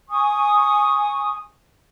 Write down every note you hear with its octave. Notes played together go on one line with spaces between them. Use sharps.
G#5 C#6 D#6